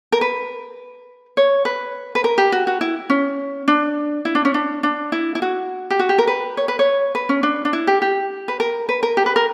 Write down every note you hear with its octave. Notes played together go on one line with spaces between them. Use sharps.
A#4
B4
C#5
B4
B4
A#4
G4
F#4
F#4
E4
C#4
D4
E4
D4
C#4
D4
D4
E4
E4
F#4
G4
F#4
G4
A#4
B4
C#5
B4
C#5
B4
C#4
D4
D4
E4
G4
G4
B4
A#4
B4
A#4
G4
B4
A#4